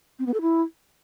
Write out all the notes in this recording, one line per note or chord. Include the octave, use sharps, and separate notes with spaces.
C4
B3
A4
E4